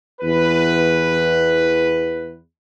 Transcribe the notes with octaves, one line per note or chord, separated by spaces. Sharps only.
E2 B4